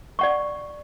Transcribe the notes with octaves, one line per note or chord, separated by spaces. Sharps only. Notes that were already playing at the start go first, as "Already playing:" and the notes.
D5 F#5 C#6